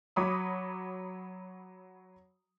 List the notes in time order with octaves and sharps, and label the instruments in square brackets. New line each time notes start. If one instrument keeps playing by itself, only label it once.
[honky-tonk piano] F#3 C#5 B5 D6 D#6